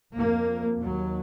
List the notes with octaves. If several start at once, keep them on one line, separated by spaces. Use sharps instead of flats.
F2 A#3
D#2 F#3